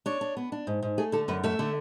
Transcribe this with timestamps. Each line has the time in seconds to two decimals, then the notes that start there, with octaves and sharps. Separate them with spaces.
0.06 D4 C#5
0.21 D4
0.37 B3
0.52 D4
0.67 G#2
0.83 G#2
0.98 A3 G#4
1.12 D3 A4
1.28 F#2 B4
1.44 A3 E5
1.59 D3